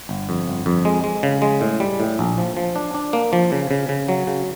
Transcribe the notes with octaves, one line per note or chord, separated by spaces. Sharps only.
G1
F2
G1
F2
G#3
G#3
C#3
G#3
A2
G3
A2
A#1
F3
F3
D4
D4
A#3
F3
C#3
C#3
C#3
F#3
C#3